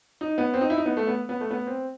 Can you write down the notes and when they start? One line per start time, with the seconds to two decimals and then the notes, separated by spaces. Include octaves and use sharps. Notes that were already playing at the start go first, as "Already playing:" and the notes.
0.21 D#4
0.38 B3
0.54 C4
0.61 D#4
0.70 E4
0.78 D#4
0.86 B3
0.97 A3
1.07 B3
1.29 B3
1.41 A3
1.51 B3
1.67 C4